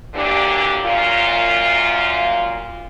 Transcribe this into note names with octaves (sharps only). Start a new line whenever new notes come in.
D3 E3 F#3 A#3 D4 G4
F#2 A#2 F4